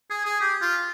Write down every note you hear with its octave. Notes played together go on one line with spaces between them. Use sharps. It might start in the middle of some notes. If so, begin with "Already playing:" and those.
G#4
G#4
G4
F4